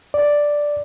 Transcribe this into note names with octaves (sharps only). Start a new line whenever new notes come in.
D5